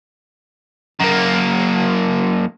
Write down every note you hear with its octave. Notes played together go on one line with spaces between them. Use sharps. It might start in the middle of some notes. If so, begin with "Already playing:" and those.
F#2 A#3